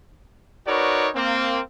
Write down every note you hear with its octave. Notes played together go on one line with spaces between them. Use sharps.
D#4 F#4 A#4 B4 C#5 D5
A#3 C4